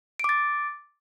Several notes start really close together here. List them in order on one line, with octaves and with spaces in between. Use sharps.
D7 D6 A6